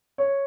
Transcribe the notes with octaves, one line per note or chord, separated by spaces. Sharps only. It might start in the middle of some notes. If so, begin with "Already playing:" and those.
C#5